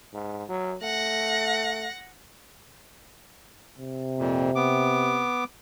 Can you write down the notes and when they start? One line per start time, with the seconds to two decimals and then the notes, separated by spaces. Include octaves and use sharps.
0.13 G#2
0.49 F#3
0.83 A3 F#5 A#6
3.78 C3
4.19 F2 A#2
4.56 B3 D6